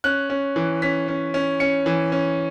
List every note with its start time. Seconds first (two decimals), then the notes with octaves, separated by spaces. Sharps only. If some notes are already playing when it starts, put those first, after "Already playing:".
0.04 C#4 F#6
0.30 C#4
0.56 E3
0.82 C#4 B6
1.08 C#4
1.34 C#4
1.60 C#4 C#7
1.86 E3
2.12 C#4